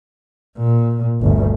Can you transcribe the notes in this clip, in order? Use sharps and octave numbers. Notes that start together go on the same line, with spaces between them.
A#2
G1 D2